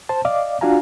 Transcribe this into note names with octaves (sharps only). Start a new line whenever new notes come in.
C5 A5
D5 D#5 F5 D6
D4 F4 F#4 F5 G#5 A#5